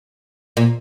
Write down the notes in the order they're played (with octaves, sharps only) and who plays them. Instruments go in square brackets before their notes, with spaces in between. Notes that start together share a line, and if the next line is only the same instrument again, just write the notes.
[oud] A#2